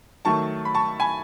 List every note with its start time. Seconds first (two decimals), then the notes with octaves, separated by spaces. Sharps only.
0.25 D#3 F#3 A3 A5 C#6
0.65 B5
0.74 A5 C#6
1.00 G#5 B5